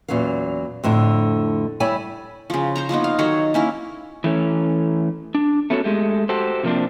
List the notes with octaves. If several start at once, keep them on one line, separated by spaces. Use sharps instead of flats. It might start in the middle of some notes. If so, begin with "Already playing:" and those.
E2 A#2 F#3 C#4 F5
F2 A2 D3
G3 E4 C#5 D5 G#5
C#3 F3
C5 C#5 A#5
F3 A#3 B3 D#4
F5
D#3 F#3 A4 C#5
A#3 C#4 E4
E3 A3 C#4
D4
A3 B3 C#4 F#4 A4
G#3 A3 G4
F#4 G4 A4 C5
C3 F3 A#3 C4 D4